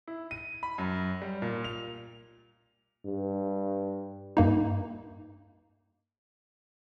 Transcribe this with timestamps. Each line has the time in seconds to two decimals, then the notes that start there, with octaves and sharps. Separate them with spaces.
0.08 E4
0.31 D#7
0.63 B5
0.78 F#2
1.22 G3
1.42 A#2
1.64 F7
3.06 G2
4.37 G2 A#3 D#4